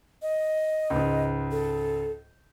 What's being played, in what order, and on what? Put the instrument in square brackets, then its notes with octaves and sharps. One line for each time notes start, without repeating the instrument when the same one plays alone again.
[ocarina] D#5
[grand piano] C#2 G#2
[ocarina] A4